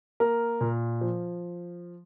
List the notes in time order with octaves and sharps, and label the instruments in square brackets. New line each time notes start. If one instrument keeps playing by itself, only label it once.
[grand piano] A#3 A#4
A#2
F3